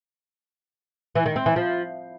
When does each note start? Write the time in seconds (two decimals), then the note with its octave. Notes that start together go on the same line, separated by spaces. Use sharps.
1.15 E3
1.26 D#3
1.36 C4
1.46 E3
1.56 F3